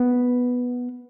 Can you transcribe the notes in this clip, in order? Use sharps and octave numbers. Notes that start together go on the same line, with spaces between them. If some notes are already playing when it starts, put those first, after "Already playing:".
Already playing: B3